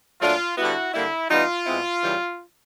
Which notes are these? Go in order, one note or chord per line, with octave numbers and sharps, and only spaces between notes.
A#2 F#3 A3 D4 F4
D3 G3 B3 E4 F#4
D3 G3 A#3 E4
E3 G3 B3 D#4 F4
B2 G#3 C4 E4
C#3 E3 G3